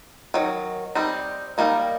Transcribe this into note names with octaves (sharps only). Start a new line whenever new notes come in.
D#3 F#3
G3 C4 D#4
D#3 G3 A#3 D#4